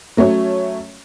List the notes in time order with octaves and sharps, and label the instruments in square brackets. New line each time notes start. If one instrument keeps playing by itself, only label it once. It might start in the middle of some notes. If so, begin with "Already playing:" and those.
[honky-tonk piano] F#3 A3 C#4 C#5